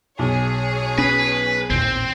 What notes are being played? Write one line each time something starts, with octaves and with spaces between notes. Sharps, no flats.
B1 G#4 C#5
C#4 B4
A1 D#2 A#2 C4